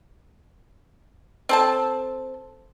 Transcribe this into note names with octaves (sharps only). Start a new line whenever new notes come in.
C4 A4 A5